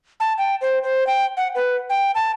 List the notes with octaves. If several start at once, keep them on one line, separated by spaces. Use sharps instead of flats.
A5
G5
C5
C5
G5
F#5
B4
G5
A5